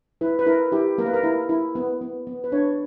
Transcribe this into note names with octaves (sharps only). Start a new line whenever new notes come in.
E4 B4
B4
E4 A#4
E4 G4
A#3 A#4
B4
A#4
E4
E4
B3
B3
B3
B4
D4 C#5